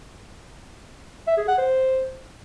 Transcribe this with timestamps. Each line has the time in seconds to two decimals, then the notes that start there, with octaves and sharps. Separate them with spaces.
1.27 E5
1.37 G#4
1.48 F#5
1.58 C5